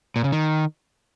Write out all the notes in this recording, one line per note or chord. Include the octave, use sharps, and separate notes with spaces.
A#2
C#3
D#3